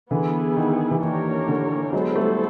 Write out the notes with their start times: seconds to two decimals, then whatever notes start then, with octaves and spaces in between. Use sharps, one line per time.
0.11 D3 E3 B3 E4 G#4
0.57 D#3
0.91 E3
1.02 D#3 A#3 D4 G4 A#4 C#5
1.48 D3
1.93 F#3 G#3 B3 E4 A4 C5
2.16 G3 A3